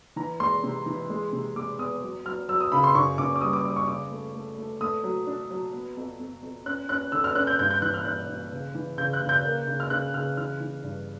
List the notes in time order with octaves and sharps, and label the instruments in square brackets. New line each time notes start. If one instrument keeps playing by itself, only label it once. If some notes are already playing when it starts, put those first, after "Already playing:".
[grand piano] E3 A#5
G#3 C6
C3
E3
G#3
C3
G#3 D6
E2 D#6
F#3
F#3 F6
F#3 E6
D#6
C#3 B5
C6
F#2 C#6
F#2 D6
D6
G3 D#6
D6
G3 D6
C#6
C#3 D6
A3
A3
A3
A3 D#6
F#3
D4
F#3
B3
F2
F2
F2
C#4 F#6
C#4 F#6
D3 E6
F6
C#4 F#6
G6
G2 G6
G6
E3 F#6
F6
G2 F#6
G2
C#3
E3
C#3 G6
F#6
C#3
G6
A#3
C#3
F6
C#3 F#6
C#3 F6
E3 F6
E3
G2